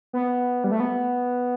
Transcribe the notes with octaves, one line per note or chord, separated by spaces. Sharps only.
B3
G3
A3
B3